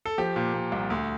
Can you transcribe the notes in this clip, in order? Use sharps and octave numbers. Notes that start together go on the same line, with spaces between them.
A4
F3 G4
A#2
A#2
C2
D2